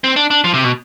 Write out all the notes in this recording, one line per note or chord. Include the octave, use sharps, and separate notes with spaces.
C4
D4
D4
F3
C3
B2